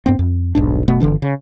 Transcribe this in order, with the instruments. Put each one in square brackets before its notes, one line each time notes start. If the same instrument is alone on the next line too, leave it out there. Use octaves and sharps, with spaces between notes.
[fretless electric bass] G2 B3 C4
F2
D#1 B1 G#2 D4
F#1 B2 A3 B3
G1 D3 E3 D4
C#3